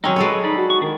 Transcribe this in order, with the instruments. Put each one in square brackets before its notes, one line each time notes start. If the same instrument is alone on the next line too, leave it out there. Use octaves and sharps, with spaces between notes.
[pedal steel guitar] D#3 G#3 D#4 [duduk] F#3 [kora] C4 C#4
[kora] G#3 A4 C#5 [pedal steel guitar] B4
[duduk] D#4 [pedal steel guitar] D5 B5
[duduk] F#4
[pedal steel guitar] C#6
[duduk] D#3 [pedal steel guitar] D4 E4